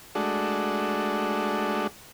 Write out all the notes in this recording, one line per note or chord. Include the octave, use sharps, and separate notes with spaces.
G#3 A3 D4 F#4